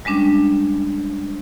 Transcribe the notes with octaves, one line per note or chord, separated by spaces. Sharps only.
G3 G#3 C#4 D4